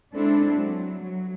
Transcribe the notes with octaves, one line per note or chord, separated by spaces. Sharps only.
G#3 C4 D4 E4 A4
F#3
F#3